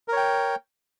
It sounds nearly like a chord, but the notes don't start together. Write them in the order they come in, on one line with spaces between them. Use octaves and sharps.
A#4 C#5 G5